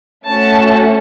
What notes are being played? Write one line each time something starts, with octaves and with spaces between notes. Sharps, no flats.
A3 C#4 F#4 A5